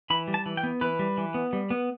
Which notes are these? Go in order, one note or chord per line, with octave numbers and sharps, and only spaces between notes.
E3 B5
G3
A5
E3
G5
B3
E3 B4
G3
E3
B3
G3
B3